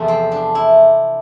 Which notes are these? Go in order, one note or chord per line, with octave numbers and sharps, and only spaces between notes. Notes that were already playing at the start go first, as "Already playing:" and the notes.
Already playing: E2 C3 F3 A3
C4
D4
E4